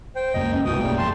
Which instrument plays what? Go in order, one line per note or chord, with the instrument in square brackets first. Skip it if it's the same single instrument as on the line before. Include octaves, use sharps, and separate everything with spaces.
[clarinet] C5 [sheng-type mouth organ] G5
[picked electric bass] C#2 F#2 A#3 [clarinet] D#5
[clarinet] C#4
[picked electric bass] C2 G#2 [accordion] B2 E3 D#6 [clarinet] F#4 [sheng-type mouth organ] G5
[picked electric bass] B1 F#2 A#3 [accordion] C#3 G3 [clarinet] A3
[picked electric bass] G1 F2 D3 [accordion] A5 C6